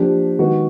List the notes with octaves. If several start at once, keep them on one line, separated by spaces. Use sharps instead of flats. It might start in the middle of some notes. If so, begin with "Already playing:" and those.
Already playing: F3 A#3 D4 G4
D#3 G#3 B3 F#4